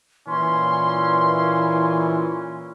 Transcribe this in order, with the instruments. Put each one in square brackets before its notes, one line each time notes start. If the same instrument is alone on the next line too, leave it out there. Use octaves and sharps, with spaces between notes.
[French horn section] A#2 E3 [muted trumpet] C#4 [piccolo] C6